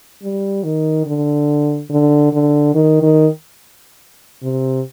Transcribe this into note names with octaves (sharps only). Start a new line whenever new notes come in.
G3
D#3
D3
D3
D3
D#3
D#3
C3